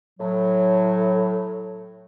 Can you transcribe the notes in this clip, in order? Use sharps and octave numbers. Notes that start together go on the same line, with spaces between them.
A2 F#3